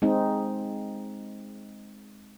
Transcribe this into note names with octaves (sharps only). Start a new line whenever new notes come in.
G#3 C4 D#4